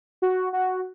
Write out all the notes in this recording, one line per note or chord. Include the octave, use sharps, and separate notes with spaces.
F#4
F#4